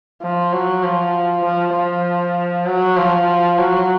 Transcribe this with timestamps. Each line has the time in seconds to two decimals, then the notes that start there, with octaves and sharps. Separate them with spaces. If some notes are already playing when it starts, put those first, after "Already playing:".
0.23 F3
0.53 F#3
0.84 F3
1.45 F3
1.75 F3
2.67 F#3
2.97 F3
3.58 F#3